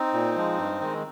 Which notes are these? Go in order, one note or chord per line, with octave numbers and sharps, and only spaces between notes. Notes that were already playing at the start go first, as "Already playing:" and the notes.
Already playing: C4 D#4
A#2
F3 G#3
G2
D#3 G#3